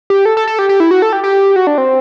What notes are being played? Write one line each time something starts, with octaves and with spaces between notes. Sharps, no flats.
G4
A4
A4
A4
G4
G4
E4
F#4
A4
G4
G4
F#4
D4
C4